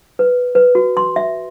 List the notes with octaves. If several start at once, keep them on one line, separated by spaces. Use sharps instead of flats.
B4
B4
F#4
C6
E5